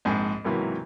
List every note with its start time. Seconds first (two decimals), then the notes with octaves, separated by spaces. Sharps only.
0.05 A#1 G#2 C4 G#5
0.45 B1 G#2 C3 E3 F#3 A#3